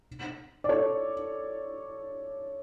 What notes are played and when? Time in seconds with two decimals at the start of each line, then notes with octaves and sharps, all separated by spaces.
0.64 D5
0.69 A4 C#5